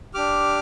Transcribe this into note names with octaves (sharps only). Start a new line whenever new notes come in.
D4 G4 D6 F6